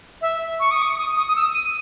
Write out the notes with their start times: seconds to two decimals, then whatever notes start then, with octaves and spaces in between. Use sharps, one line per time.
0.21 E5
0.60 C#6
0.71 D#6
0.82 C#6
0.98 D#6
1.17 D#6
1.28 D#6
1.36 E6
1.54 D#7